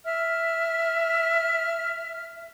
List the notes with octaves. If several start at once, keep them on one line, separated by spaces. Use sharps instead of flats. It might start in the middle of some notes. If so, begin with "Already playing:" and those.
E5 F6